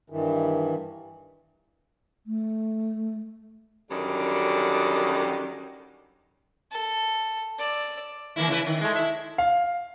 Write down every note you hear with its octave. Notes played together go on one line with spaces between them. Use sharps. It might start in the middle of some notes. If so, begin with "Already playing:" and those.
G2 D#3 E3
A3
F#2 D3 D#3 G3
A4
D5 E6
E3 A#3 E4
C#3 E4 B4
D#3
G#3 A3
E4 E5
F5